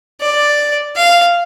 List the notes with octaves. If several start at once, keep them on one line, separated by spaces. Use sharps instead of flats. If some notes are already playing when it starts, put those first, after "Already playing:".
D5
F5